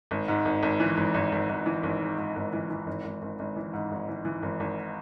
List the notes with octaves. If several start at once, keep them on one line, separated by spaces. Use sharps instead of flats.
G#1
G#2
G#1
G#1
E3
G#1
G#1
G#1
G#1
E3
G#1
G#2
G#2
G#1
E3
E3
G#1
G#1
G#1
G#1
E3
G#2
G#1
E3
E3
G#1
G#1